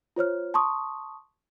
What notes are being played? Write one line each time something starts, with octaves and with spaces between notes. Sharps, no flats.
F4 C5 C#5 F6
A5 C6 C#6 D#6